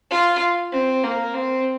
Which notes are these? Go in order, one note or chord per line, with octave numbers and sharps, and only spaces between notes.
F4
C4
A#3
C4